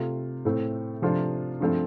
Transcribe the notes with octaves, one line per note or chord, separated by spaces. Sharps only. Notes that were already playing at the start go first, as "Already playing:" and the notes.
Already playing: C3 A3 F4
A2 A3 C4
C3 F3 A3 D4 F4
G2 F3 A3 C4